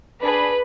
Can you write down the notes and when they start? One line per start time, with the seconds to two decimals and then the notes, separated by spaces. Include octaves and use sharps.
0.21 D4 G#4 B4